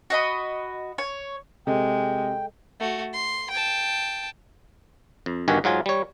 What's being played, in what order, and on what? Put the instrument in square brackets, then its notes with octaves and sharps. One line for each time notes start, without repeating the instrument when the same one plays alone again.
[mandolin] F#4 D#5 B5
C#5
[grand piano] C3 [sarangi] G#3 [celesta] A4 D#5 [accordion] G5
[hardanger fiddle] A3 F#4
C6
G5 A5
[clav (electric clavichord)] F2
G1 G2 D#3 F#4 G4 G#5
G#2 F#3 F4 G#5
G3 C#5